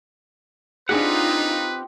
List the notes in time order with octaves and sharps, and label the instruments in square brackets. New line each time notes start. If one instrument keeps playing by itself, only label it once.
[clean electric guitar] C4 G4 F#5 [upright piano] D4 G#4 [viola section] D#4 F4 [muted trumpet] B4